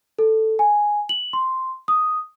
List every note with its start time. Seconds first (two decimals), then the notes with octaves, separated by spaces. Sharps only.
0.19 A4
0.59 G#5
1.09 F#7
1.33 C6
1.88 D#6